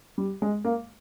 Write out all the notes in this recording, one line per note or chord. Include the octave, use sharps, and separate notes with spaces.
G3
G#3
A#3